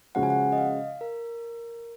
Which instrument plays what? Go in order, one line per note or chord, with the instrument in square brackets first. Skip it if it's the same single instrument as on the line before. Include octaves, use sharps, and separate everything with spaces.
[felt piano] C#3 F3 G#3 C#4 F#4 [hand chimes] F#5
[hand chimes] G#5
F#5
D#5
F5
A#4